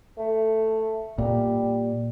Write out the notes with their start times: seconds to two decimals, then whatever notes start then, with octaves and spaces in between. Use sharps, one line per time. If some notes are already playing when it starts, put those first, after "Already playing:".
0.18 A3
1.18 A#2 G3